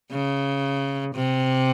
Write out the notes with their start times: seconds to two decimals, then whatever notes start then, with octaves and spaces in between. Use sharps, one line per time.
0.11 C#3
1.15 C3